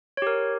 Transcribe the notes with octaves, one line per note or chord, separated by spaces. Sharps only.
G4 A#4 C#5